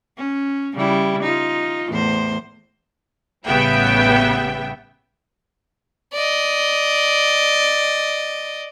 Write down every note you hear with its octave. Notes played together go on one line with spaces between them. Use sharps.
C#4
C#3 G3 E4
D#4 F4
E2 A2 C5
A1 C#3 G3 B3 E5 G5
D5 D#5